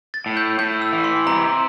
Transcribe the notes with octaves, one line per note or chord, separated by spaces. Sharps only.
A6
A2
G6
A2 G6
E6
E3
C6
C3 A#5